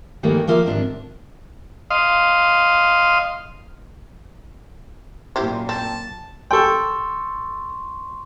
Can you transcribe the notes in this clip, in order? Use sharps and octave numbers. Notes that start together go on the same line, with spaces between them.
G2 D#3 E3 G3 A3 A#3
F3 A#3 F4 E5
G#2 C3 D#3 D4
D#5 F5 C6
F#2 A#2 E4 G4 C5
C4 A5
A4 G5 C6 C#6